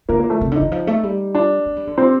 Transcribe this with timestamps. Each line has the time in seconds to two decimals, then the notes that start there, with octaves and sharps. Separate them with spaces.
0.09 D3 A#3 A#4
0.20 A#3 A#4
0.30 A3 A4
0.41 C3
0.51 D3 D#4
0.62 D#3
0.71 F3
0.87 A3
1.03 G3
1.35 D4
1.66 A3
1.76 G3
1.87 D3
1.98 C3 C4 C5